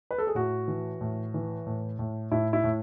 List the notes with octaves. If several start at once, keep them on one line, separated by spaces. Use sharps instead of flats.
B4
A4
G#4
A2 F#4
E3
A2
E3
A2
A2
A2 E4
E4
A2